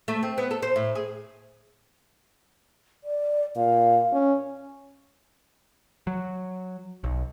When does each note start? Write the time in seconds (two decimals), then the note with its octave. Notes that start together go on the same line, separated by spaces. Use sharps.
0.08 A3
0.23 C4
0.38 B3
0.51 A4
0.62 C5
0.76 A2
0.95 G#4
3.04 D5
3.56 A#2 F5
4.13 C#4
6.07 F#3
7.04 B1